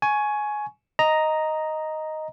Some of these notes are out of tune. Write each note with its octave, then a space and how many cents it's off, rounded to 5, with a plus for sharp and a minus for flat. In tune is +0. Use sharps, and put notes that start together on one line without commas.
G#5 +15 C#6 +0
D#5 +0 A#5 +0